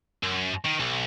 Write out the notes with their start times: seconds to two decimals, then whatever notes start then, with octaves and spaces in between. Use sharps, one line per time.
0.23 F#2
0.65 D#3
0.80 B1